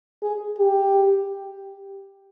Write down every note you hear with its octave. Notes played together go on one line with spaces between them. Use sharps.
G#4
G4